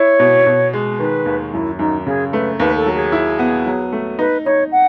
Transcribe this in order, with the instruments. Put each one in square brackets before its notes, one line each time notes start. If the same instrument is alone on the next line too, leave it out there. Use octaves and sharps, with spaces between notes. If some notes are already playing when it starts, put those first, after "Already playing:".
Already playing: [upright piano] E4 [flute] C#5
[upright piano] B2
B2
G#3
[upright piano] D#3 [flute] B4
[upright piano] D#2
[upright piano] F#2 [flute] E4
[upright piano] F#2 [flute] D#4
[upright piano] C#3 [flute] G#4
[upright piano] A3 [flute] B4
[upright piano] D#2 [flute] B4
[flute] A4
[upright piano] F#3
[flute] G#4
[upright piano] E4
B3
F#3
A3
[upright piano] D#4 [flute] B4
[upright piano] D#4 [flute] C#5
[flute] F#5